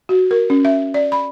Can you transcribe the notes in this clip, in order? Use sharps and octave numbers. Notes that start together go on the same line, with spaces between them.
F#4
A#4
C#4
E5
D5
B5